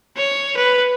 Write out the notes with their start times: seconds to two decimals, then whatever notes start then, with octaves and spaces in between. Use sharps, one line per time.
0.17 C#5
0.57 B4